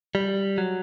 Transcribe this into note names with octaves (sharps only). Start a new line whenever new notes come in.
G3
F#3